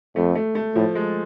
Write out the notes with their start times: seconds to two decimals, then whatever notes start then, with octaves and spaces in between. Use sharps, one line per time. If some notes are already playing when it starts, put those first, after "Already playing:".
0.16 F2 A3
0.35 A3
0.55 A3
0.75 A2 F3
0.95 G#3